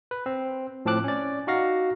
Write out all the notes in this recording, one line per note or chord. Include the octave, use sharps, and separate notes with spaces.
B4
C4
A2 F3 C4 A5 D6 F#6
C#4 D5
D#4 F#4 F5 A#6